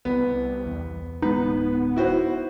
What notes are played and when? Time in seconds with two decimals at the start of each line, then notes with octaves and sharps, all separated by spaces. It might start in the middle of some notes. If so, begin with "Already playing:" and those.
0.05 C2 B3
0.66 E2
1.22 D1 G#3 B3 D#4 B4
1.96 E4 F#4 C5